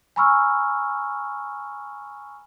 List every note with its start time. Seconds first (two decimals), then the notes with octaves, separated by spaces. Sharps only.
0.16 G#5 A#5 B5 C#6 E6 F6